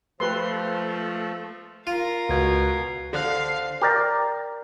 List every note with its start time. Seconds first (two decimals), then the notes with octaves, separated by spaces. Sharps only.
0.20 F3 A3 G4 B4 C6
1.87 F4 A#4 F5
2.29 C#2 B2 G#6
3.13 D3 A4 C5 D5 F5 F#6 C7
3.82 G4 A#4 D5